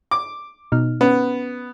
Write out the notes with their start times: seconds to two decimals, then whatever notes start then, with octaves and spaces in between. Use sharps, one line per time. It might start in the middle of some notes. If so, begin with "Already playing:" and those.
0.11 D6
0.72 B2 D#4 F6
1.01 B3 C#4